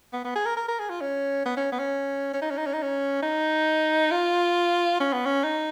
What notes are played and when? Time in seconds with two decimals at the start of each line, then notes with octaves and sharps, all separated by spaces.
0.13 B3
0.24 B3
0.35 G#4
0.46 A#4
0.57 A#4
0.68 A#4
0.79 G#4
0.90 F4
1.01 C#4
1.46 B3
1.57 C#4
1.72 B3
1.79 C#4
2.33 C#4
2.42 D#4
2.50 C#4
2.58 D#4
2.67 C#4
2.74 D#4
2.82 C#4
3.23 D#4
4.11 F4
5.00 C#4
5.13 B3
5.26 C#4
5.44 D#4